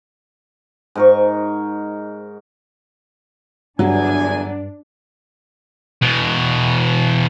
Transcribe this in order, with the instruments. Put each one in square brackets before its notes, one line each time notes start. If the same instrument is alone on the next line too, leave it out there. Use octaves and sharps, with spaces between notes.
[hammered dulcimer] G#2 A#4 C#6
[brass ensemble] G1 E2 G#5 [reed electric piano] G2 [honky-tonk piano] F#3 [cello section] D4
[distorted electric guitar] E2 B2